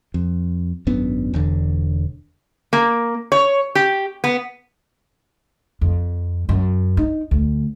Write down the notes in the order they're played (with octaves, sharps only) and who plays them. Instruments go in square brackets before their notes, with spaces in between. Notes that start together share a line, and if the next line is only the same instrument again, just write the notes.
[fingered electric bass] F2
G#1 F#2 B3 D4
E1 E2 D3
[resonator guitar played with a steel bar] A#3
C#5
G4
B3
[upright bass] F2
F#2
D#4
D2